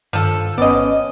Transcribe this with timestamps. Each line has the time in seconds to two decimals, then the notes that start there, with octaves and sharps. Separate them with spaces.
0.13 G2 D#3 F3 A4
0.58 G1 B3 C#4 B4 D5 D#5